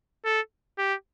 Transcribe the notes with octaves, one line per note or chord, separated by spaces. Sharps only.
A4
G4